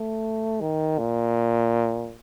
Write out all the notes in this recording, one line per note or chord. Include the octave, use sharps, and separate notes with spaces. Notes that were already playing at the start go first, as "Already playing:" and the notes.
Already playing: A3
D#3
A#2